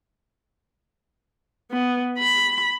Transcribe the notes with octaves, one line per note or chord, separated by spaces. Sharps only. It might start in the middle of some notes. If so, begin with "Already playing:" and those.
B3
B5